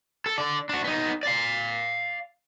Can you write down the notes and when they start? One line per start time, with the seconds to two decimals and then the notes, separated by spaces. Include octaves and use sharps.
0.26 A4
0.38 D3 D5
0.69 D4 F#4
0.84 B3 D#4
1.23 D5 F5